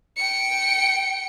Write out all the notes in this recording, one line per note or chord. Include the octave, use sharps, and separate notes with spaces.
G5 C#7